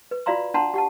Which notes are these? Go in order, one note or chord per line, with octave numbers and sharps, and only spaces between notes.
B4
F4 F#4 D5 F5 A#5 C6
D4 F#5 A5 A#5 C6
G4 F#5 A5